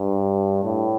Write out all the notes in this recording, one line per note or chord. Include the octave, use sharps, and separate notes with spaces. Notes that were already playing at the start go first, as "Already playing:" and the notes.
Already playing: G2
A2